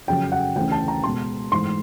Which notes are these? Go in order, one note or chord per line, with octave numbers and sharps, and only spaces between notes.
F2 C#3 F#3 G5
F#5
D2 C#3 E3 G5
A5
A#5
B2 G#3 B3 C6
G#2 E3 A3 C6